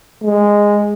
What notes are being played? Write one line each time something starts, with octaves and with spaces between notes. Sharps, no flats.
G#3